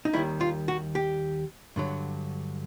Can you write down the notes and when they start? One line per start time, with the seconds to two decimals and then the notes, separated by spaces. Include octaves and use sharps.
0.05 D#4
0.13 D#2 D#3 G3 E4
0.41 F4
0.68 F#4
0.95 G4
1.76 G2 D3 F#3